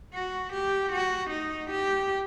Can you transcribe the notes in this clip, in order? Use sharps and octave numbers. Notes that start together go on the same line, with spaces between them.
F#4
G4
F#4
D#4
G4